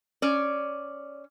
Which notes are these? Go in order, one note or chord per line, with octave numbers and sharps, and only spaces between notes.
C#4 D5